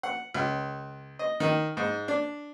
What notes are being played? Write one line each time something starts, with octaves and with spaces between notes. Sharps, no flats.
F#5
C#2
D#5
D#3
G#2
D4